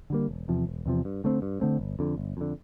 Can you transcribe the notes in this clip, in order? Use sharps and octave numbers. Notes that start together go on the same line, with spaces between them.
D3 G3 A#3
E1
E2 C3 F3
E1
E2 C3 F3
G2
D3 A3 C4
G2
D3 A3 C4
G1
F2 D3
G1
F2 D3